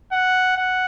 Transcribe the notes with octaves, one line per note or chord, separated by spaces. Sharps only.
F#5
F#5